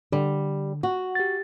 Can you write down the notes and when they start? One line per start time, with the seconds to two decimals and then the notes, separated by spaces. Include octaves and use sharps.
0.12 D3 G3
0.83 F#4
1.15 G4 A6